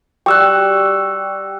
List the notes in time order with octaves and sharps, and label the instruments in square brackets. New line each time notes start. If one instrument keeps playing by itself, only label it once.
[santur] G3 F#4 D6 [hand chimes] G5 E6 F#6